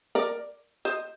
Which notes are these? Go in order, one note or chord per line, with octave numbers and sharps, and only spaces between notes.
A#4 D5
C5 D#5